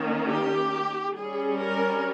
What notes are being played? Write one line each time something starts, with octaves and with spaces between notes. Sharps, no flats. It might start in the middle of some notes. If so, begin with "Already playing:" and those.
Already playing: D#3 A#3 C#4
G4
G3 C#4 G#4
A#4